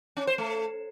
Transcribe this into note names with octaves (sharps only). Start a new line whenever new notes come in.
C#4
C5
A3